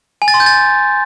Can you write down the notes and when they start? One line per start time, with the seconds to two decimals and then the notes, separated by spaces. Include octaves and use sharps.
0.22 G#5
0.28 A6
0.34 C6
0.40 G6
0.46 A6